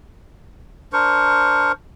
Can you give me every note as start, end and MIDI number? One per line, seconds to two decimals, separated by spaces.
0.93 1.72 62
0.93 1.72 70
0.93 1.72 72
0.93 1.72 85